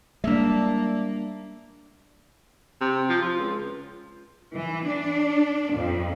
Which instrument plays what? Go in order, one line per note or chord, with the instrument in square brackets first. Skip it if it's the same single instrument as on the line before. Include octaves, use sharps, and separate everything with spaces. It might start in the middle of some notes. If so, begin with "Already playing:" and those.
[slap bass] G3 G#3 [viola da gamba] A#3 [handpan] D4 E5
[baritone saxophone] C3
F3
F4
C#2
[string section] E3
D4
F2